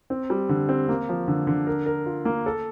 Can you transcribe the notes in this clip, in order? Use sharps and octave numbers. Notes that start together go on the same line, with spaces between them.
C4
G3
D3
C4
A#3
F3
D3
D3
A#4
A#4
F4
A#3
A4